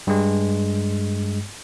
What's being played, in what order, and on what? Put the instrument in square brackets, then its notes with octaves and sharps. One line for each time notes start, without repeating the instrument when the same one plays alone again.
[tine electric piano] G2 G#3